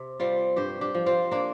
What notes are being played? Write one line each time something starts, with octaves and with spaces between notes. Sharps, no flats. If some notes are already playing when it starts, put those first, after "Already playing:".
Already playing: C3
G3 C4 F4
G2 G4 C5
D4 G4
F3
C4 F4
A#3 D4